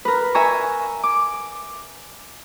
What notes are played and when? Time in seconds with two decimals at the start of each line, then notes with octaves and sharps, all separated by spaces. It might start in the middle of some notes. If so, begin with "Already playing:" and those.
0.05 A#4 B4
0.35 E5 G#5 A#5 C#6
1.03 D6